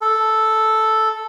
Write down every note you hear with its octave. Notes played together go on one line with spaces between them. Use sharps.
A4